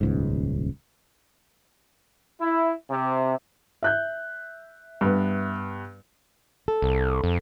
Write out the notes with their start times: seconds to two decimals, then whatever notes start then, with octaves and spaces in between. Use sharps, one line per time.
0.01 D#1 C#2 G#2
2.41 E4
2.91 C3
3.83 E5 F#6 G6
5.01 G2 B3
6.68 A4
6.82 C2
7.24 F2